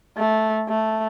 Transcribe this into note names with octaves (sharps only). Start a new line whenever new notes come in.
A3
A3